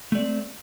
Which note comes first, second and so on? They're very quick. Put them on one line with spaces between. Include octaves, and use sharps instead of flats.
A3 D5 C4